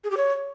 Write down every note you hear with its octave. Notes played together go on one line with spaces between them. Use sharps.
G#4
G4
C#5